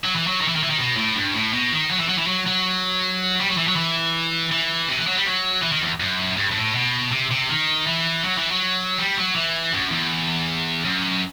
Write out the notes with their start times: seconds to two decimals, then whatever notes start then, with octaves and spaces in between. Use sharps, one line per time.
0.04 F#3
0.15 E3
0.27 F#3
0.41 D#3
0.48 E3
0.56 D#3
0.63 E3
0.70 D#3
0.78 B2
0.96 A2
1.16 G2
1.34 A2
1.53 B2
1.72 D#3
1.91 F#3
1.99 E3
2.09 F#3
2.18 E3
2.27 F#3
2.47 F#3
3.39 G3
3.49 F#3
3.57 E3
3.68 F#3
3.76 E3
4.51 E3
4.89 C3
4.98 E3
5.07 F#3
5.16 G3
5.26 F#3
5.62 E3
5.72 D#3
5.81 E2
6.00 F#2
6.37 G2
6.51 G2
6.56 A2
6.75 B2
7.12 C3
7.31 C3
7.49 D#3
7.87 E3
8.24 F#3
8.38 E3
8.51 F#3
8.98 G3
9.17 F#3
9.35 E3
9.73 F#2
9.92 E2
10.85 F#2